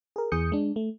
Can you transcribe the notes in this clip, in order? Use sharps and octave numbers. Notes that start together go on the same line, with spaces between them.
G#4 A#4
E2 E3 G#4 D#6 G6 C#7
G#3 D4
A3